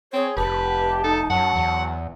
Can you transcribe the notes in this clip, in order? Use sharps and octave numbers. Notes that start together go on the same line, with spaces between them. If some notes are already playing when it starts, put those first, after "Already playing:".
C4 G#4 C#5
F1 G4 B4 A5
D#4 A4
F#2 F#3 F#5
E2